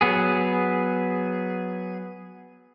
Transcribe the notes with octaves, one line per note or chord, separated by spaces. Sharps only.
F#3 B3 G#4